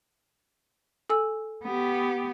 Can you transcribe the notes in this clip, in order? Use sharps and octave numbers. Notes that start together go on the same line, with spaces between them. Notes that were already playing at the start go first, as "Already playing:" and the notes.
A4 G#5 E6
B3 G4